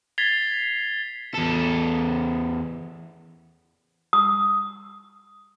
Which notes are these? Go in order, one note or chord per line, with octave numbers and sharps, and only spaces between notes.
G#6 A6 B6 C7 F7 G7
E2 A4
D#6